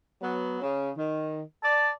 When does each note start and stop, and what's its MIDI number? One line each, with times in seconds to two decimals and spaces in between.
0.22 0.59 54
0.22 0.59 59
0.61 0.91 49
0.96 1.40 51
1.63 1.91 74
1.63 1.91 81